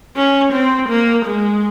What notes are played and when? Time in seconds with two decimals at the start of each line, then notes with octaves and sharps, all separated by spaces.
0.16 C#4
0.53 C4
0.89 A#3
1.26 G#3